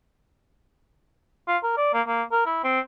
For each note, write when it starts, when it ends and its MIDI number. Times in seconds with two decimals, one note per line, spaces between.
1.48 1.57 65
1.63 1.77 70
1.77 1.91 74
1.93 2.02 58
2.07 2.23 58
2.32 2.43 70
2.46 2.62 64
2.64 2.80 60